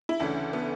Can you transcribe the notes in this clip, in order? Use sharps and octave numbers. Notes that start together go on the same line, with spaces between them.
E4
D2 C#3 E3 A3 D4
B3